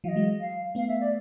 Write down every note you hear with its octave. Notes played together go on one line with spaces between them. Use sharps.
E3 F#3 D#5 F5
F#3 G#3
F5
A3 B3 F5
E5
D5